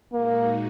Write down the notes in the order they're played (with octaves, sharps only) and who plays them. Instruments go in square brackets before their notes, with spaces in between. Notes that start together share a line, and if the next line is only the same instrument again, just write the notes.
[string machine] A#2 G#3 D#4 F#4 [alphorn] A#3